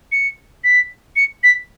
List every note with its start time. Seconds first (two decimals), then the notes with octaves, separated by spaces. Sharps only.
0.12 C#7
0.64 B6
1.16 C#7
1.44 B6